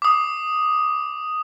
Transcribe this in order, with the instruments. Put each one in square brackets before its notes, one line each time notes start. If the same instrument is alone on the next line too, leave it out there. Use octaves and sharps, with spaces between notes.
[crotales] D6 D#6